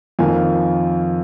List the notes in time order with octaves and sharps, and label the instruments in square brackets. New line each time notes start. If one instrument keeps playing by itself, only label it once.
[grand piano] F2 D#3 A#3 F5 G#5